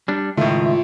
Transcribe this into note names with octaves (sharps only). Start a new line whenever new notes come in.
G3 D4
C#2 A2 D#3 A3 F4 E5